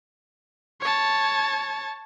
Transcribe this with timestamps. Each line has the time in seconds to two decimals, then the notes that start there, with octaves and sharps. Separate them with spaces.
0.81 C#5 A5